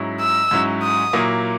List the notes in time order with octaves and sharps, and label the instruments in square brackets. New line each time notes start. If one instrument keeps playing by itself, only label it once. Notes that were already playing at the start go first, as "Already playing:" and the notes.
Already playing: [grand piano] G#2 F#3 C#4 E4
[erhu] E6
[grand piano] G#2 F#3 C#4 E4
[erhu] D#6
[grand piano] A#2 F#3 A#3 E4